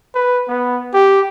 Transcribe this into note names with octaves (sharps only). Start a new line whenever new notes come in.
B4
B3
G4